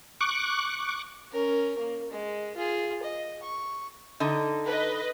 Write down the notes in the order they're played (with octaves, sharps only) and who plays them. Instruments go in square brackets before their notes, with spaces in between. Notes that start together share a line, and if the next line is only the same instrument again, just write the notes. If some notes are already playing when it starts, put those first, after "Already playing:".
[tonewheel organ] C#6 D6 F#6
[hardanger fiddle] C#4 A#4
A#3
G#3
F4 G#4
D#5
C#6
[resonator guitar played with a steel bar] D3 D#4
[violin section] B4 D#5